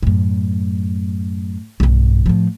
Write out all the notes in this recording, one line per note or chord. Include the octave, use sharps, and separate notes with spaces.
F#2 A2
B1 G2
A2 F3